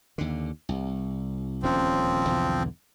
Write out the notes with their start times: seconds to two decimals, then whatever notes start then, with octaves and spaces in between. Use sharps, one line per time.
0.18 D#2 D3
0.69 C2
1.63 D#1 D2 F3 C4 C#4
2.26 B1 E2 D3